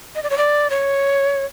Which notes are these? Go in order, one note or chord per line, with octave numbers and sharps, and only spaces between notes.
D#5
D5
C#5
D5
C#5